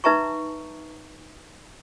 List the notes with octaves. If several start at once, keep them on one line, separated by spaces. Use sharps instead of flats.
D#4 B4 E5 A5 A#5 C#6